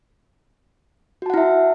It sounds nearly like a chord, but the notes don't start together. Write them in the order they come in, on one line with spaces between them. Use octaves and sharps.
F#4 A5 F#5 E4 E5